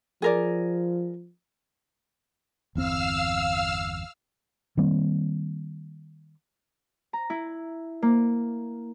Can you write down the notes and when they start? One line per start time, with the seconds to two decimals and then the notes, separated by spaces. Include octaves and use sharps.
0.22 F3 G#4 A#4 D5
2.75 G1 E2 C4 F5 E6 F6
4.77 D#3 G3 A#3 C4
7.13 A#5
7.30 E4
8.02 A#3